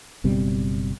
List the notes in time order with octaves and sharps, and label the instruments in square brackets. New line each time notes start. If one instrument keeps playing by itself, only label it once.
[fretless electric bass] F#1 B2 G3 C4